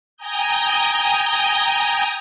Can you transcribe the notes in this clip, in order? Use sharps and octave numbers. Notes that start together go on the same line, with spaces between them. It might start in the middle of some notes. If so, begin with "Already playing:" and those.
G5 G#5 A#5 D#6 G6